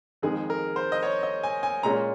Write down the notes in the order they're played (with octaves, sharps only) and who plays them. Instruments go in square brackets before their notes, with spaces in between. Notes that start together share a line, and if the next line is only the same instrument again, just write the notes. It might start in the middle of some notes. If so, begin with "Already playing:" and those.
[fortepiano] F2 D#3 G#3 [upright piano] G#4
[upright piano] A#4
C5
D#5
C#5
D#5
G#5
G#5
[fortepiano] A#2 G#3 C#4 [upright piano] A#5